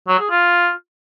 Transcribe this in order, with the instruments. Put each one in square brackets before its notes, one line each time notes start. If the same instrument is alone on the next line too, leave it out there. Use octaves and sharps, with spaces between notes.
[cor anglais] F#3
G#4
F4